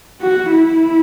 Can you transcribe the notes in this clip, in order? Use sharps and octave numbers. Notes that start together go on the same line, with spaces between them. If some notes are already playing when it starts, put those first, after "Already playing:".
F#4
E4